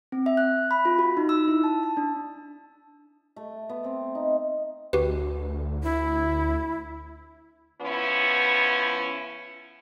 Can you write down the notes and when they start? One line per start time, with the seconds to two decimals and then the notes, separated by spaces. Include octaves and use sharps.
0.12 C4
0.26 E5
0.37 F#6
0.71 B5
0.85 F4
0.99 F#4
1.17 D#4
1.29 E6
1.48 E4
1.64 A5
1.83 A5
1.97 D4
3.36 A3
3.69 B3
3.84 C4
4.15 D#4
4.93 D2 F#4 G4 B4
5.83 E4
7.81 F3 B3 C#4 E4